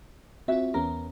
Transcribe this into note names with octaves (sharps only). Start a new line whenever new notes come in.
C4 F4 F#4 E5
E2 B3 C#4 A#4